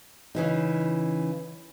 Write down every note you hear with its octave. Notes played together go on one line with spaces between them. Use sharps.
C#3 E3 D#4